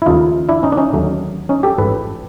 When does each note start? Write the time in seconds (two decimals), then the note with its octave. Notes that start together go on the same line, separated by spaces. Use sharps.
0.02 E4
0.06 D#2 C#3 F3 A3 D#4 F4
0.49 D4 E4
0.63 C#4 D#4
0.72 D4
0.77 C#4 D#4
0.93 D#2 D3 F#3 A3
1.49 C#4 D#4
1.63 G4 A4
1.78 A1 G#2 F3 A4 B4